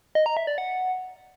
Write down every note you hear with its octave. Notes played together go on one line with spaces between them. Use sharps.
D#5
A#5
E5
D5
F#5